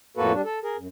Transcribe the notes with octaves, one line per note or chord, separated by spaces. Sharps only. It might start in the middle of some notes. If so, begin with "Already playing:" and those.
F2 A2 A#3 F#4 A4 B4
G3 D4
A4
G#4 A#4
F#2